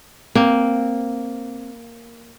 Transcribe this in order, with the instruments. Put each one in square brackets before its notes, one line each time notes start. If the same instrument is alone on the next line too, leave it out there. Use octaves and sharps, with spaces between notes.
[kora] A#3 [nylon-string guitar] C4